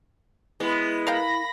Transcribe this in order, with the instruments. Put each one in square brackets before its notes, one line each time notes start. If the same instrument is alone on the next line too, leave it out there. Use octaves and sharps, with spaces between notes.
[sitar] G#3 B3 [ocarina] E4
[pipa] A#4 F5 G5 [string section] B5 A#6